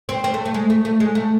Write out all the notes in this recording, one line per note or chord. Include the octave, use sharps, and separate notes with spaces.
C4
C4
A3
A3
G#3
A3
A3
G#3
A3